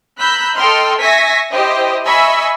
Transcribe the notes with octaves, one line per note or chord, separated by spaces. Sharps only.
A#5 B5 E6 F#6 G6 B6
A4 D#5 G5 C6 F6
E5 G#5 C#6 G#6 A#6 B6
E4 G4 C5 D#5
D#5 E5 G#5 B5 C#6 E6